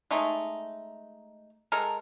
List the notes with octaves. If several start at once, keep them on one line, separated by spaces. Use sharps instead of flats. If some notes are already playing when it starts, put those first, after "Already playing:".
G#3 A3 D#4
G#3 A4 A#4